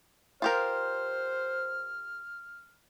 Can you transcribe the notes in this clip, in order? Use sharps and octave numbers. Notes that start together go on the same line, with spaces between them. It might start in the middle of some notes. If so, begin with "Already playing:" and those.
F4 G4 A#4 C5 F6